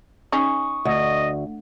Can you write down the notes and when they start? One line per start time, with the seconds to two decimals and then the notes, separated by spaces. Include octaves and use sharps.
0.32 C#4 D#4 G#4 C#6 D#6
0.85 D2 D#5